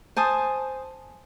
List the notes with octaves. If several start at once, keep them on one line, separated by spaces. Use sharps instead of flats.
C5 G#5 A5 D#6